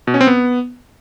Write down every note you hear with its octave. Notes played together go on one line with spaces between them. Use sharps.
B2
C#4
C4
B3